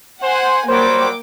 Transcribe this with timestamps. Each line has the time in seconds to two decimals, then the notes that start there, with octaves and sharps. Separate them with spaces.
0.22 C5 F#5 G#5
0.68 F#3 G3 A#3 C5 G5 D6